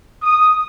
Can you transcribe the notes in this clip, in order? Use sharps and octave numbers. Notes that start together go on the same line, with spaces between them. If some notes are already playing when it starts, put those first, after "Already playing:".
D#6